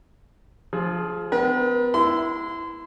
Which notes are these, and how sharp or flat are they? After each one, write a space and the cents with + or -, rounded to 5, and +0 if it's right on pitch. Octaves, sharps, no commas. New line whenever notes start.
F3 +0 G#4 +30
B3 +40 B4 -45
E4 +0 C6 -30